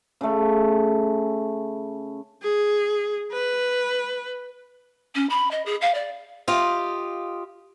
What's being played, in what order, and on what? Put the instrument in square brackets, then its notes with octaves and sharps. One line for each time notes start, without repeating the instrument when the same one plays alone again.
[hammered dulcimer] C#3 A3
[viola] G#4
B4
[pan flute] C#4
B5
D#5
G#4
F5
D5
[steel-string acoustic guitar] F4 G4 D#5